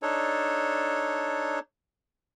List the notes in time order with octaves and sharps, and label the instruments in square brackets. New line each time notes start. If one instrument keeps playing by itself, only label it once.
[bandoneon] D4 D#4 A4 C#5